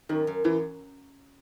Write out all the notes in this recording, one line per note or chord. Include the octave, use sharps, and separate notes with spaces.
F#2 D#3
F#2
F#2 E3